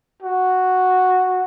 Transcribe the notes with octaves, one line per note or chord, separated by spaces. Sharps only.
F#4